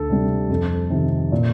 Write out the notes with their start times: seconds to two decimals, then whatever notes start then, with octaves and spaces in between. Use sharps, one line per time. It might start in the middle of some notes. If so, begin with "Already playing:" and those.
Already playing: D2 A4
0.09 C3 G3
0.49 F2
0.90 C3 D#3
1.32 A#2